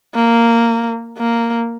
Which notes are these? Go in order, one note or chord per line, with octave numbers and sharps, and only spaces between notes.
A#3
A#3